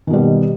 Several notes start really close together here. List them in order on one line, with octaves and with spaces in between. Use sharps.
D#3 B2 G3